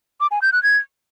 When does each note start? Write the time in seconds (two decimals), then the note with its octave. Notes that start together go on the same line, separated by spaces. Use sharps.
0.21 D6
0.31 G#5
0.42 G6
0.52 F#6
0.63 G#6